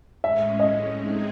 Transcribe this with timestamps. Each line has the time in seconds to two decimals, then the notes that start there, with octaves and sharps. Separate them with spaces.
0.24 A2 G#3 C#4 E5
0.60 D#5
0.96 A2 G#3 C4 D#4 G#4